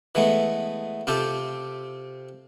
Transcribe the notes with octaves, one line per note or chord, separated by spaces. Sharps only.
E3 G#3 A3 B3
C3 C4 F4 G4 A4